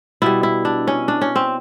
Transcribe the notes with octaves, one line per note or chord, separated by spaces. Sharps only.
B2 G3 E4
E4
D4
C#4
D4
C#4
C4